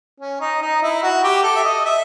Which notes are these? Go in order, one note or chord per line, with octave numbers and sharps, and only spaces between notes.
C#4
D#4
D#4
E4
F#4
G4
A4
E5
D#5
E5